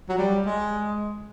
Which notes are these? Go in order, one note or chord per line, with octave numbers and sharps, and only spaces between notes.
F#3
G3
G#3